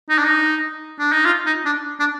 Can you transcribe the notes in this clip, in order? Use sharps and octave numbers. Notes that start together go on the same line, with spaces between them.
D#4
D4
D#4
D4
D#4
F4
D#4
D4
D4